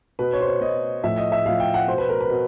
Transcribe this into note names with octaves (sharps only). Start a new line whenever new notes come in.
B2 B4
C#5
C5
C#5
B2 D#5
A2 F3 E5
D#5
E5
A2 F3 F5
G5
F#5
B2 C5
B4
A#4
B4
B2